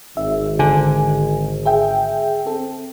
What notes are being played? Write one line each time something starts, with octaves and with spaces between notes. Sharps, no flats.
G#1 E5
D3 G#5
G#4 E5 G5
C4 A4